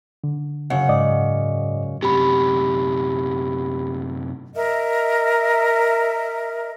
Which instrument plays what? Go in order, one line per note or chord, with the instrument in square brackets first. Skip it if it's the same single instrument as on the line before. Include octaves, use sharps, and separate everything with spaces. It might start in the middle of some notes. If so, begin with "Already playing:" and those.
[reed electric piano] D3
[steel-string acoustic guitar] F#2 C#3 F#5
[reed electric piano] G#2 D5 D#5
[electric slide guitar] F#2 C3 [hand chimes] G4 B5
[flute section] A#4 D#5 E5